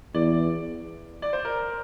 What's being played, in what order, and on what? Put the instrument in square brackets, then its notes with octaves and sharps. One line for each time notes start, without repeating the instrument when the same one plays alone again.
[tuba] E2 [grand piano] D5
[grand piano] D5
C5
A#4